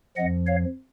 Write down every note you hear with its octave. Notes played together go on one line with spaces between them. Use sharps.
F2 F3 D#5 F#5
C#5 F5